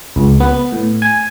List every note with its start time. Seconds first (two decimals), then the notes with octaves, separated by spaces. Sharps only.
0.16 C#2
0.40 B3
0.72 A2
1.02 G#5